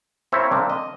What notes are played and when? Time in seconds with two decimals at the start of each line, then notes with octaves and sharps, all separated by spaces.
0.32 A#3 C4 E4 C5 C#5 E5
0.51 A#3 C4 D4
0.70 D#5